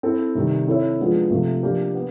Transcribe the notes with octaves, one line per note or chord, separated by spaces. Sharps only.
C4 E4 A4
C3 D#3 G3
C4 E4 A4 C#5 E5
F3 G#3 B3 D4 F4
C3 F3 A3
F3 A#3 D4 G4 A#4
B3